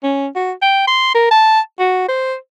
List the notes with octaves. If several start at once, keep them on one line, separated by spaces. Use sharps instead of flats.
C#4
F#4
G5
C6
A#4
A5
F#4
C5